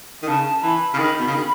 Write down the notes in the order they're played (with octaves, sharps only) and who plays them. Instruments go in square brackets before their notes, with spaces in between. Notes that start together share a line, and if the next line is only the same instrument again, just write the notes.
[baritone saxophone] D#3
[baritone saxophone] C#3 [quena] A5
[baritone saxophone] E3 [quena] B5
[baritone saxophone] C#3
[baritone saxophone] D#3 [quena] B5
[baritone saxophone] B2
C#3
D#3